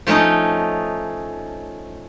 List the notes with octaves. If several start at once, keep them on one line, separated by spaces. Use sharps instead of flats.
F3 A3 C#4 D#4 D#5